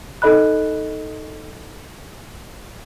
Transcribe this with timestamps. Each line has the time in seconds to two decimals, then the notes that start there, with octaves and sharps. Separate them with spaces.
0.22 D#4 A4 D#5 B5 F#6